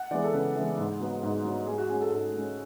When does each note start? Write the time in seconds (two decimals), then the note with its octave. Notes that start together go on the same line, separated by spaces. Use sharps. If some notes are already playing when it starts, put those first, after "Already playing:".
Already playing: F#5
0.11 E3 G#3 B3 D5
0.24 A4
0.33 C#3 B4
0.55 E3 G#3 B3
0.77 G#2
1.00 F#3 B3
1.23 G#2
1.45 F#3 B3
1.67 G#2 G#4
1.78 F#4
1.89 G#3 C#4 G#4
2.01 A4
2.12 G#2 A4
2.34 G#3 C#4